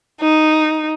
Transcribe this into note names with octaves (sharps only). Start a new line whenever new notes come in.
D#4